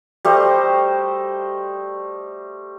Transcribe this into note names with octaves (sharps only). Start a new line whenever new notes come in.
G3 A3 C5 D#5